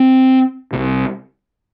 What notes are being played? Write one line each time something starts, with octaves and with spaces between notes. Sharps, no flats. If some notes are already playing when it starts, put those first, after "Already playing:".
Already playing: C4
C2 C3